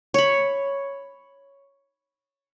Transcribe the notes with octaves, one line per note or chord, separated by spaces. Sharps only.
C#5 B5